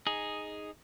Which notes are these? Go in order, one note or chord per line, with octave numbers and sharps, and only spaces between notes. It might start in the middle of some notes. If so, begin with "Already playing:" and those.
D#4 G#4